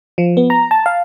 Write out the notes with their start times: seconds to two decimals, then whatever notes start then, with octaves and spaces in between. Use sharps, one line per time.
0.18 F3
0.37 B3
0.50 A#5
0.71 A5
0.86 F5